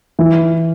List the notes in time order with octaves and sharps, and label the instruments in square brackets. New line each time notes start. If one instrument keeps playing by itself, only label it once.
[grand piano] E3